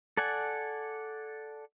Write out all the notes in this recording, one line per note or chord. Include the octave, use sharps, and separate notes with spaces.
A4 D5 F#5 G#5